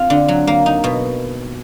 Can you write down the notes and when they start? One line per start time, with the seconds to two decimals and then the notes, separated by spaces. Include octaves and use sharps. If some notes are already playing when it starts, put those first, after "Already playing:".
Already playing: C4 F4
0.10 D3
0.28 F#3
0.47 A#3
0.66 D#4
0.84 B2